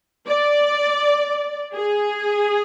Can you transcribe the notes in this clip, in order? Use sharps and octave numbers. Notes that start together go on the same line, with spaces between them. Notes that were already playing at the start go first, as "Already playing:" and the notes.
D5
G#4